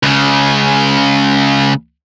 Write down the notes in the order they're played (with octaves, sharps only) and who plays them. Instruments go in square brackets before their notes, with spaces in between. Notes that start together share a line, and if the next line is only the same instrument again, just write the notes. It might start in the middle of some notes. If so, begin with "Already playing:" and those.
[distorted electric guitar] C#2 C#3